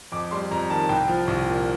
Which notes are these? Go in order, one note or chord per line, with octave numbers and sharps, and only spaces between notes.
F2 D6
G3 C6
F2 A#5
D#3 A5
C2 G5
F3
C2
A#2